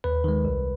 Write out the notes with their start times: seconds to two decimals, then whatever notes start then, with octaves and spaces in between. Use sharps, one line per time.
0.04 D#2 B4
0.24 D#3 G#3
0.45 C2